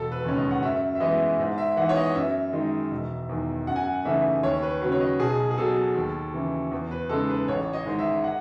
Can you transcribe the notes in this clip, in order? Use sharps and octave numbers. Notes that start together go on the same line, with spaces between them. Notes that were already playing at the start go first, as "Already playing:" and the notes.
Already playing: E1 A4
B4
D#2 C#3 G#3 C#4
D#5
F#5
F#2 E5
E5
E3 G#3 B3 E4 D#5
G#2
E5
E3 B3 D#4 F#5
C#5
D#5
D#5
F#2 E5
D#3 G#3 D#4
E1
E2 D#3
F#2 F#5
G#5
F#5
C#3 E3 A3 D#4 E5
D#2 C#5
B4
C#3 F#3 B4
C#5
D#5
B1 G#4
G#4
B2 F#3 A4
D#2
C#3 E3
E2
B4
C#3 G#3 D#4 A4
B4
A1 C#5
D#5
G#2 D#3 G#3
E5
F#5